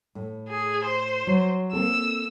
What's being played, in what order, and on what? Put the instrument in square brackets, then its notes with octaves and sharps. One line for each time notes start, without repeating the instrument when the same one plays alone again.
[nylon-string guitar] A2
[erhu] G#4
C5
[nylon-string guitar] F#3
[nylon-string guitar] A#3 C4 A4 [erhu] E6